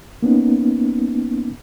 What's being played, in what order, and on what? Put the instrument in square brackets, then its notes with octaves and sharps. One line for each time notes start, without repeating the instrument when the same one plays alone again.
[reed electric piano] A#3 B3 C#4 D#4